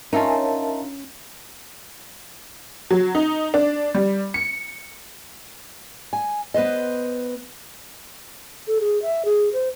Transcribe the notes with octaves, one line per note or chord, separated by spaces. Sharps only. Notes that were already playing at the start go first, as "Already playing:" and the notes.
C#4 D#4 F4 A#4 E5 A5
F#3
D#4
D4
G3
C#7
G#5
B3 B4 C5 D#5
A4
G#4
E5
G#4
C5